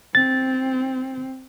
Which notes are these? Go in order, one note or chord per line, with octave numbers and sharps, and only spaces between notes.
C4 A6